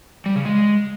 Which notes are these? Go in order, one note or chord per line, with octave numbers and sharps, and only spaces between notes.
G3
C#3
G#3